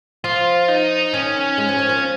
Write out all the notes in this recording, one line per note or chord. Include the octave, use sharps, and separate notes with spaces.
F3 F4
D#4
D#3 C#4
G#3
F3
D#3
F3